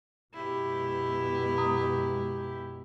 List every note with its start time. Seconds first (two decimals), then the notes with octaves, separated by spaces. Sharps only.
0.34 F#2 B2 G#3 E4 G4
1.58 A#5 D#6